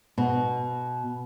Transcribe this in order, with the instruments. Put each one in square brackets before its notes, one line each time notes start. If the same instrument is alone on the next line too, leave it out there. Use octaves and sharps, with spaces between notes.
[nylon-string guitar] B2